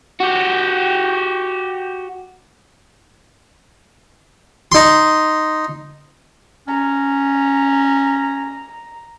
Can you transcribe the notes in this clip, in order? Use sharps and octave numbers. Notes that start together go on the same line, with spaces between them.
F#4 G4
D#4 C6
C#4 A#5